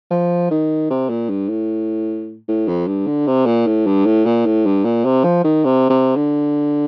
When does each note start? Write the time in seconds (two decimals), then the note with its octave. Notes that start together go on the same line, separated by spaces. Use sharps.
0.11 F3
0.51 D#3
0.90 C3
1.10 A#2
1.30 G2
1.49 A2
2.48 A2
2.68 F2
2.87 G2
3.07 D3
3.27 C3
3.46 A#2
3.67 A2
3.86 G2
4.06 A2
4.26 A#2
4.46 A2
4.66 G2
4.85 A#2
5.05 C3
5.24 F3
5.44 D#3
5.64 C3
5.90 C3
6.16 D3